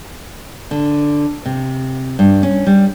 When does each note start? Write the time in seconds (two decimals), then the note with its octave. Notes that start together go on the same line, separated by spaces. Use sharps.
0.71 D3
1.46 C3
2.19 G2
2.43 C#4
2.66 G3